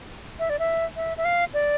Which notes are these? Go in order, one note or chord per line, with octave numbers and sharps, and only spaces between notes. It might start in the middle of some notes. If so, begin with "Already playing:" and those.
E5
D5
E5
E5
E5
F5
D5